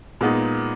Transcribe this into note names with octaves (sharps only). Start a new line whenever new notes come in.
A#2 G#3 B3 D#4